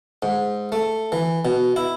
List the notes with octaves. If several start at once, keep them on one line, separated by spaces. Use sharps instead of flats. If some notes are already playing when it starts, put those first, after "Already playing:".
G#2
A3
E3
B2
E4